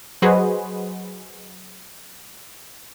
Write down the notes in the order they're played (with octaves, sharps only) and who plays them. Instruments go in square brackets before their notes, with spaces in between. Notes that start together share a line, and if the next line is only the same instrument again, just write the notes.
[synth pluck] F#3 F#4 G#4 B4 C5 D#5